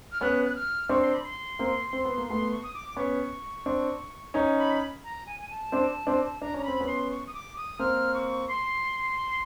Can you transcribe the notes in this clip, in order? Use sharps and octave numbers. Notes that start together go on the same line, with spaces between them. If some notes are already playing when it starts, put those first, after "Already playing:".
F6
B3 C#4 F#6
F#6
F6
C4 D4 C#6
C6
B5
C6
A#3 C4
C4
B3
A#3
A3 B3 C6
C#6
D#6
D6
B3 C#4 C#6
C4 D4
C#4 D#4
B5
A#5
G#5
G#5
A5
C4 D4
C4 D4
D4 A#5
C#4 A#5
C4 B5
B3 C#4
C6
C#6
D#6
D6
D#6
A#3 C4 F6
C#6
C6